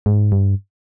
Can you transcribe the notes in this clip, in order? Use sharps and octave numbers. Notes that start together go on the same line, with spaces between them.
G#2
G2